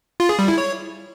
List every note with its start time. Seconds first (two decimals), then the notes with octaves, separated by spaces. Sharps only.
0.20 F4
0.29 G#4
0.39 G3
0.48 E4
0.58 C#5